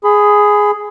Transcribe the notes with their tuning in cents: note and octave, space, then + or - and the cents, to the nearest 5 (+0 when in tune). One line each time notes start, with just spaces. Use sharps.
G#4 +0 B5 +25